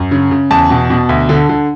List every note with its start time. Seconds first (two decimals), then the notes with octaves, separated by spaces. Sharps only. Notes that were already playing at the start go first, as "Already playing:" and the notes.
Already playing: F#2
0.11 C#3
0.31 C#3
0.51 E2 A5
0.70 B2
0.90 B2
1.09 D2
1.29 D3
1.49 D3